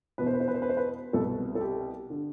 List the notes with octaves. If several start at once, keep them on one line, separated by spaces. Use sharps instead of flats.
E2 B2 B4
C5
B4
C5
B4
C5
B4
C5
B4
C2 B2 A4
A4
G4
D3